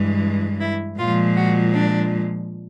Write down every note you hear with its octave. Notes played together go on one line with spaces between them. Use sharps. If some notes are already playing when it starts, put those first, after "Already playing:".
Already playing: G2 E3 G#3
E4
A#2 F3 G#3 F4
F#4
D4